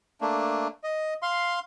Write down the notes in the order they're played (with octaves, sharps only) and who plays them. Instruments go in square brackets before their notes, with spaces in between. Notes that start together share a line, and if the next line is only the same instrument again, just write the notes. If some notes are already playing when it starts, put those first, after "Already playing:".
[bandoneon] A3 A#3 D4
D#5
F5 C6